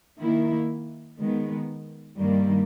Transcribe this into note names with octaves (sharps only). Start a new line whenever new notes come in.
D#3 A#3 E4
D#3 G#3 B3
G2 D#3 G3 A#3